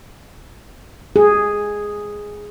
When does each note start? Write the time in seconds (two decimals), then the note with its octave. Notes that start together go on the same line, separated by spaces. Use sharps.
1.16 G#4